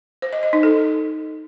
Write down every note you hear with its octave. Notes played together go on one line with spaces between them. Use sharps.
C5
D#5
D#5
D#4
A4